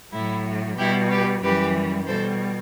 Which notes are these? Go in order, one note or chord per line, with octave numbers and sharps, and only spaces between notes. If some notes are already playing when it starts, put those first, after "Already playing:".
A2 F#3 E4
B2 G3 E4 G4
G4 B4
F#2 E3 G3 G4 B4
B2 G3 A4 C5